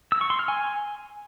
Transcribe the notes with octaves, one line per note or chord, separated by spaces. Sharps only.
E6
C#6
C6
F6
G#5